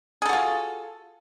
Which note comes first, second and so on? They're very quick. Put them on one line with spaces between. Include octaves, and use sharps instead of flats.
G#4 A4 F#4 F4